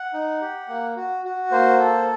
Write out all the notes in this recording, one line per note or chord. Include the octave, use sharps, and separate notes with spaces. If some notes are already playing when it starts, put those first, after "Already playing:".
Already playing: F#5
D#4
G4
A#3
F#4
F#4
A#3 C5
A4